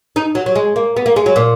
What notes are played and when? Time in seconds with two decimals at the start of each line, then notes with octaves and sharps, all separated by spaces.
0.16 D#4
0.35 F#3
0.46 F#3
0.56 G#3
0.76 A#3
0.97 B3
1.06 A#3
1.16 G#3
1.26 F#3
1.36 A#2